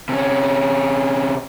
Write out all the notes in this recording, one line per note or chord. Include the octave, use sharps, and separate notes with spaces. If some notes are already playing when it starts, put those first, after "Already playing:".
C3 C#4